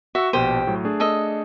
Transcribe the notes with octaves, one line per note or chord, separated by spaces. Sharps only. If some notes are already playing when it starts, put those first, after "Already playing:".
F#4 E5 C#6
A#1 B2 G4 C5 D#7
A2 F#3
A3 D4 G#4
A4 D#5